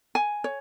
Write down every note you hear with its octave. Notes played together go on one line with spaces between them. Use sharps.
G#5
C#5